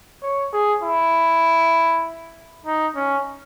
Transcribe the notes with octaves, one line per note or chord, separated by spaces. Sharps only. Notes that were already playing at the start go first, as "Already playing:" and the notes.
C#5
G#4
E4
D#4
C#4